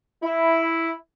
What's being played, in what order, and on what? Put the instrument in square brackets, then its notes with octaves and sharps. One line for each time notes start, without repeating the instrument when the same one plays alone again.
[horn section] E4